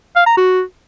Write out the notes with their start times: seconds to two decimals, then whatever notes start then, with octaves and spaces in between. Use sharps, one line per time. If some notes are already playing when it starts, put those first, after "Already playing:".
0.16 F5
0.26 A#5
0.37 F#4